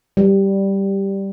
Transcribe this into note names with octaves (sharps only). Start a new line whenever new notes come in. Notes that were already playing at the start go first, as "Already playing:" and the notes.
G3